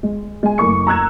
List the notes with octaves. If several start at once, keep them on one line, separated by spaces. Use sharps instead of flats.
G#3
G#3 G#5
F#1 A3 A#3 C#6 D6 C#7
A#5 E6 F#6 G#6 E7